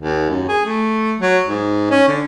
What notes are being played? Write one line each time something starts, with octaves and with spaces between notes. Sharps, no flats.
D#2
F#2
G#4
A3
F#3
G#2
C#4
D3